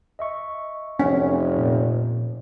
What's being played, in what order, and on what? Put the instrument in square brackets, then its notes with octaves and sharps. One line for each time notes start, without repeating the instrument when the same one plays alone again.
[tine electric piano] D#5 E5 C#6
[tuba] F1 [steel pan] C#4
[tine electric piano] A#2